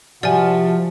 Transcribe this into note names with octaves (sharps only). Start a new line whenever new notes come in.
C3 F3 F#4 D5 G#5 A5